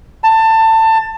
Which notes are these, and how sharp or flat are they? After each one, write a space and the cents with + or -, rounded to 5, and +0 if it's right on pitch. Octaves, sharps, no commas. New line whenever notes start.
A5 +20